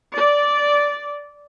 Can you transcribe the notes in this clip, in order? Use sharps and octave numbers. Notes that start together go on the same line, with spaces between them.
D5